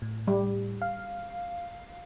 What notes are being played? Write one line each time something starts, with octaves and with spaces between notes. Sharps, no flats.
A2
G3
F5